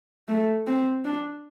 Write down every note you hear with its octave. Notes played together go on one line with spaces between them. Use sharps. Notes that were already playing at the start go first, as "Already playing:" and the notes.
A3
C4
D4